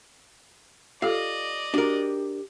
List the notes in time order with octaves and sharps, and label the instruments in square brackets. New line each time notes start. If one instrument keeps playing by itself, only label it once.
[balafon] F4 G4 A4 [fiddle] D5 D#5 [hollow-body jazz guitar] F5
[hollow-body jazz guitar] D4 A#4 [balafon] F#4 [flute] G4